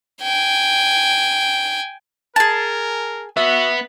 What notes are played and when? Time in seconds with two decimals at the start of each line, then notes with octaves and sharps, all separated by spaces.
0.23 G5 G#5
2.36 G#4 A#4 A5
3.37 B3 F#4 E5